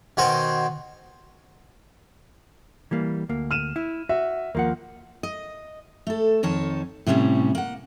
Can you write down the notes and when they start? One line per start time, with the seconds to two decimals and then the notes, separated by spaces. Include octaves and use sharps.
0.17 B2 D#3 F#4 C5 G#5
2.91 E3 G3 A#3
3.29 D2 A#3
3.51 F6 D#7 E7
3.76 E4
4.09 F#4 E5
4.55 D#2 F3 A#3 F#5
5.23 D#5
6.07 A3 A4
6.43 F2 D#3 C#5 A5
7.06 A2 C3 G3 A#3 C#4
7.55 A#3 F#5